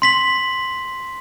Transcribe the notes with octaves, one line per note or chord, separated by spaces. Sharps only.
C6 B6 F#7